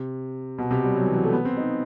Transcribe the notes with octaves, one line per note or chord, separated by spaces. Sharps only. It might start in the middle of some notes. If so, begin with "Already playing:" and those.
Already playing: C3
B2
C3
G3
F#3
E3
F#3
A3
B3
C4
D#4